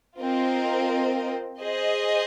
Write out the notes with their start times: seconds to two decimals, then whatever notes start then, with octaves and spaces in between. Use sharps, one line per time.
0.18 C4 F4 A#4 D#5
1.60 G#4 C5 D#5